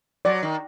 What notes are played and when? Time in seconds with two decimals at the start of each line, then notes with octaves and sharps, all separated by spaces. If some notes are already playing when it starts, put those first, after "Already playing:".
0.25 F#3 D5
0.42 D#3